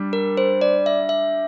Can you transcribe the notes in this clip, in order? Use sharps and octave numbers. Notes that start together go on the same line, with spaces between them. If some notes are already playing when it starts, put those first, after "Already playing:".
Already playing: G3 D4
A#4
C5
D5
E5
E5